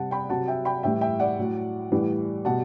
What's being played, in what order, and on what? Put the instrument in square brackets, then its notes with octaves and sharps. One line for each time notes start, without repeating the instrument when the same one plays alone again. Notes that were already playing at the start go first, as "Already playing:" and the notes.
Already playing: [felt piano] C3 G3 F#5 A5
G5 B5
C3 F#3 F#5 A5
E5 G5
G5 B5
A2 E3 G3 E5 G5
E5 G5
D5 F#5
A2 F#3
A2 E3 G3
B2 G3 F#5 A5